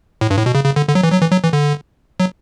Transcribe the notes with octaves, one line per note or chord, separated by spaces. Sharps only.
A2
G2
A2
B2
C#3
C#3
D3
D3
F#3
E3
F#3
E3
F#3
E3
D3
F#3